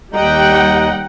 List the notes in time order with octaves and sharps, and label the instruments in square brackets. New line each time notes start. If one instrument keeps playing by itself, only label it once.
[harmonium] D#2 D#5 A#5 [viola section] G3 F#5 G5